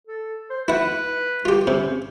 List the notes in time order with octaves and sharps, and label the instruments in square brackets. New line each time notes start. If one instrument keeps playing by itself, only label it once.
[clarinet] A4
C5
[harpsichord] E4 F#5 [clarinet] B4
[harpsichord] F4 G4
[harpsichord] C3 [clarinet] C#4